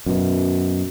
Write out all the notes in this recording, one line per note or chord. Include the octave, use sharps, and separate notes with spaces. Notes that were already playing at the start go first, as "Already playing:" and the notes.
F#2 B2